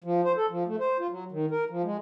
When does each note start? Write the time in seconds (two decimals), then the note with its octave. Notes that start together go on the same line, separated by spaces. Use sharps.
0.04 F3
0.24 C5
0.37 A4
0.50 F3
0.67 A3
0.80 C5
0.99 F4
1.11 F#3
1.32 D#3
1.51 A#4
1.70 F3
1.83 G#3